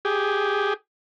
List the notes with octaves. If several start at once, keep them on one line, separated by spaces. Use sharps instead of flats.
G4 G#4